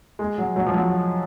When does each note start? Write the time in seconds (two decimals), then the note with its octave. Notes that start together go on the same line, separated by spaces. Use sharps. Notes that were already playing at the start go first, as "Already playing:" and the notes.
0.19 G#3
0.38 F#3
0.56 F#3
0.66 F3
0.74 F#3